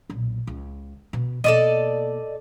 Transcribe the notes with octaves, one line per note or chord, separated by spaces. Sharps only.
B1 A#2
C#2
B2
B2 A#3 A4 D5 D#5